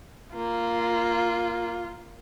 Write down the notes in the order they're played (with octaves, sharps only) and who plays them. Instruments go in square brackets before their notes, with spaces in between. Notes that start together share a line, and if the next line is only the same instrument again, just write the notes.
[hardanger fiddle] A#3 [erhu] F4